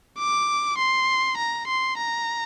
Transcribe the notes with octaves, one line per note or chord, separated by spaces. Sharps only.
D6
C6
A#5
C6
A#5